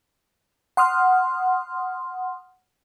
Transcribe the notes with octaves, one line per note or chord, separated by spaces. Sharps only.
F#5 C6 D#6 F6